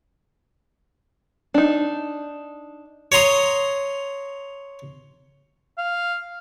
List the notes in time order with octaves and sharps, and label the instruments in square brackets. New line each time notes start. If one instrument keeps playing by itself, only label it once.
[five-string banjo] D4 D#4
[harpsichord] C#5 A#5 C6 D#6
[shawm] F5